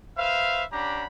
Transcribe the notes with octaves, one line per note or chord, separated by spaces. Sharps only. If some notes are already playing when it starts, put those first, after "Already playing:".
B4 C5 E5 F5
C#4 D4 G4 F#5 A#5 B5